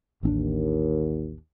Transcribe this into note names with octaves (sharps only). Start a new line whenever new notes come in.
A1 D#2 C4 D4